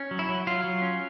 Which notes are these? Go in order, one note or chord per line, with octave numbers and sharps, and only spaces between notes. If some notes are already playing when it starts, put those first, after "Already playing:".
Already playing: C#4
F#3
E4
F#3
F#3 F4
F#3
C#4